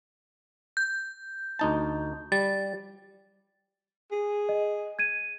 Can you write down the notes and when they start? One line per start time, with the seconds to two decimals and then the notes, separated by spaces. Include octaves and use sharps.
0.77 G6
1.59 D2 D#4 A5
2.32 G3 A6
4.12 G#4
4.49 D#5
4.99 G#6 D#7